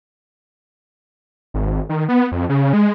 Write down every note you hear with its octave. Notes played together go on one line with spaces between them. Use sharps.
G#1
D#3
B3
F2
C#3
G#3